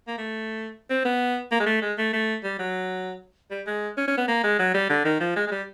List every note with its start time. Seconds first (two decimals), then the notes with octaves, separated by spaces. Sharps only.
0.08 A#3
0.18 A3
0.90 C4
1.05 B3
1.52 A#3
1.60 G#3
1.66 A3
1.82 G#3
1.98 A3
2.13 A3
2.44 G3
2.59 F#3
3.51 G3
3.67 G#3
3.97 C#4
4.07 C#4
4.18 B3
4.28 A#3
4.44 G#3
4.59 F#3
4.74 G3
4.90 D3
5.05 D#3
5.20 F3
5.36 G#3
5.47 G#3
5.51 G3